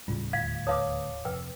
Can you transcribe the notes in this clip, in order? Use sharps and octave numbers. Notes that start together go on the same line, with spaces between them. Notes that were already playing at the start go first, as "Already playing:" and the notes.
D#1 C#2 A2 C#3 G3 F4
D2 F5 G#6 B6
B4 C#5 F5 A5 D6 D#6
F2 C3 B4 G5 E6